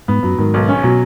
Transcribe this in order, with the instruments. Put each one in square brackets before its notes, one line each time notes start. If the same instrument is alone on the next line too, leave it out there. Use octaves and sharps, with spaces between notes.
[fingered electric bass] G#2 [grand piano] B3
[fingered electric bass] F#2 [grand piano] F#3
[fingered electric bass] G#2 [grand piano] D#3
[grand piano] B1
C#4
[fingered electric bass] B2 [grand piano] F#3